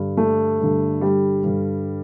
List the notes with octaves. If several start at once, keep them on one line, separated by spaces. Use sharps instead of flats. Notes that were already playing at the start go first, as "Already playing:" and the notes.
Already playing: G2 D3
A3
G2 D3
G3
G2 D3